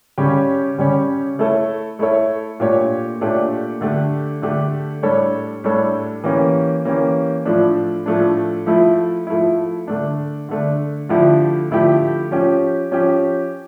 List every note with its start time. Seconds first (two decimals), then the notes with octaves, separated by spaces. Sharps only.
0.18 C#3 G3 C#4 G4 C#5
0.78 C#3 G3 C#4 G4 C#5
1.39 A3 E4 A4 C#5
1.99 A3 E4 A4 C#5
2.60 A#2 A3 D4 G4 C#5
3.21 A#2 A3 D4 G4 C#5
3.81 D3 A3 D4 G4
4.42 D3 A3 D4 G4
5.02 A2 G3 D4 A4 C#5
5.64 A2 G3 D4 A4 C#5
6.24 E3 A#3 C#4 G4
6.85 E3 A#3 C#4 G4
7.45 A2 F3 A3 D4
8.06 A2 F3 A3 D4
8.66 F3 A3 E4
9.27 F3 A3 E4
9.87 D3 A3 D4
10.49 D3 A3 D4
11.09 D3 F3 A3 E4 G4
11.71 D3 F3 A3 E4 G4
12.31 F3 C#4 G4
12.91 F3 C#4 G4